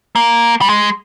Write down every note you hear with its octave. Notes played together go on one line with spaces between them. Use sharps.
A#3
G3
G#3